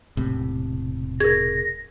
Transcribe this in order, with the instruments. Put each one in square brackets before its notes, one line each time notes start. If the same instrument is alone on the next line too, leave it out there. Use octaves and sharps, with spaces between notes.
[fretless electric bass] E1 A2 C3
[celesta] G#4 A#4 [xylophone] G#6 [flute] A#6